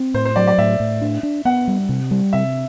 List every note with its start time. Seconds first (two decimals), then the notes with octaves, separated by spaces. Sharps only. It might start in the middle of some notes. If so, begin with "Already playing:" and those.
Already playing: C4
0.14 A2 C5
0.25 C5
0.36 F#3 D5
0.47 D5
0.58 A2 E5
0.80 A2
1.01 D4
1.23 D4
1.45 B3 F#5
1.68 G3
1.89 C3
2.11 G3
2.33 C3 E5